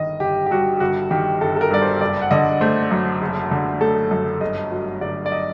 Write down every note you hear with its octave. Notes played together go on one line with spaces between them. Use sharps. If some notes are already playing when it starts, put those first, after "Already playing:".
Already playing: G1 D#3 D#5
G1 G4
G4
G2 F#4
G4
G1 F#4
D#3 G4
G1 A4
A4
A#4
G2 D5
C5
F#1 D5
F#5
D3 D#5
A3 C5
F#2
F#1
D3
A3 A4
F#2
G1 D#5
F#3
G1 D5
D5
D#5